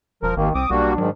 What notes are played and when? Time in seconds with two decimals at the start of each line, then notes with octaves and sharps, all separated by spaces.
0.23 E1 F3 A#4
0.37 G#1 D#2 D#3 A#3
0.55 C2 C4 D6 D#6
0.70 B1 G3 A#3 D4 F#4
0.98 G#2 D#3 F#3